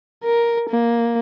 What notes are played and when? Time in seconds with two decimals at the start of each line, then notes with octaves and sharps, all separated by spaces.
0.24 A#4
0.70 A#3